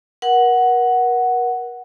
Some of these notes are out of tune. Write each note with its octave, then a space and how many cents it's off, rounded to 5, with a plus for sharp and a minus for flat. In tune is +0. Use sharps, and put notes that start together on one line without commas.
A#4 +35 F#5 +0